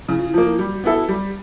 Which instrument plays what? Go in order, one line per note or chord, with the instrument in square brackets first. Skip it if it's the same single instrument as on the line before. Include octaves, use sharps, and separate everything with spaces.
[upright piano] C#3 [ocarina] E4
[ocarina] F4
E4
[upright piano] F3 A#3 [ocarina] F4
[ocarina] E4
[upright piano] G3 [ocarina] F#4
[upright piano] B3 E4 A4
[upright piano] G3 [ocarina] G4